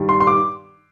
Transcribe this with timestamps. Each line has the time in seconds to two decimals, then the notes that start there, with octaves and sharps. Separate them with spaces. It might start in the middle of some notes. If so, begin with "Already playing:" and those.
Already playing: G2 D#3 G3
0.09 C6
0.20 C6
0.27 D6